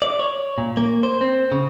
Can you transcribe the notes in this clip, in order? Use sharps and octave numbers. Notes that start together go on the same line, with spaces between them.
D5
C#5
A#2
A#3
C5
C4
C#3